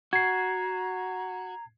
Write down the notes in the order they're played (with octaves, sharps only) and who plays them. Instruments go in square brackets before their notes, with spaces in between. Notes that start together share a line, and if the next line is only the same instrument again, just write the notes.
[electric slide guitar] F#4 [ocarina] A#5 [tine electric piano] G#6 C7